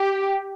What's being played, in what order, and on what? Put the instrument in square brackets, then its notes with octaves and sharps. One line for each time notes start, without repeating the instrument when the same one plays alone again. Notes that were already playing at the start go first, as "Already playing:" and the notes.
Already playing: [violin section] G4